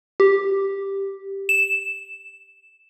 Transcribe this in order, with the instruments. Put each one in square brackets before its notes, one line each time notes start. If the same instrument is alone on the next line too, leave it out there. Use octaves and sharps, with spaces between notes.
[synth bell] G4
E7